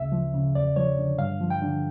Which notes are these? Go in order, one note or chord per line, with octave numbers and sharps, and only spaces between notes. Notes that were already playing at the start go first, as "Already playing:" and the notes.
Already playing: D2 C#3 E5
F3
C#3
E2 D5
F3 C#5
D3
G2 F5
F3
G5
D3